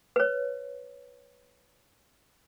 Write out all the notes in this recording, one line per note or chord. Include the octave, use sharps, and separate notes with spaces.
B4 C#5